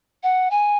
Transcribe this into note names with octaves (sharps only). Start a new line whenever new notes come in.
F#5
G#5